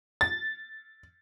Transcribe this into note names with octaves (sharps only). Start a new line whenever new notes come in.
A6